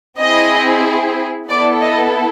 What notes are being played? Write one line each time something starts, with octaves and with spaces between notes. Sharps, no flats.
C4 E4 G#4 D#5
B3 E4 A4 D5
D#5